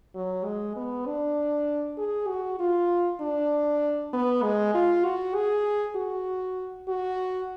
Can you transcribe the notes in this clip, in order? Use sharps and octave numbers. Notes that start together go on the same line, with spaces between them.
F#3
G#3
B3
D4
G#4
F#4
F4
D4
B3
G#3
F4
F#4
G#4
F#4
F#4